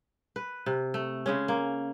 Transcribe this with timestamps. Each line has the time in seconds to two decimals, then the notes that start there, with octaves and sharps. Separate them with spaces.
0.36 B4
0.66 C3
0.94 A3
1.26 C#3 G#3 C#4
1.48 A#3